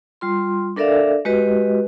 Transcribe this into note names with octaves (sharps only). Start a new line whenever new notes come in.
G3 F4 C6
D4 A4 A#4 D5 E5 F5
G#3 F#4 G4 B4 D#5